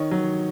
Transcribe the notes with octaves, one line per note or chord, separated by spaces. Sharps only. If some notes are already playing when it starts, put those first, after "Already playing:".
Already playing: D#3 C#5 D#5
F#3